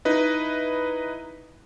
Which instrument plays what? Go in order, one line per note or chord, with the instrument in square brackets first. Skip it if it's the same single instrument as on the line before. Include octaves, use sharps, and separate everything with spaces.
[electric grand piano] D#4 E4 B4 D#5